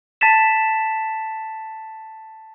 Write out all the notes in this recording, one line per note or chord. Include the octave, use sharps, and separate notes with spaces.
A5 A6 B6 E7